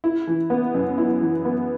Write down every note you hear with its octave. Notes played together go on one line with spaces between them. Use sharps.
E4
E3
B3
F#2
E4
E3
B3